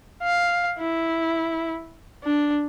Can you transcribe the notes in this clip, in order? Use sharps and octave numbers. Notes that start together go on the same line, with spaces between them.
F5
E4
D4